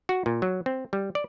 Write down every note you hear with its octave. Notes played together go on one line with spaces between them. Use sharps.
F#4
A#2
F#3
C4
G3
D5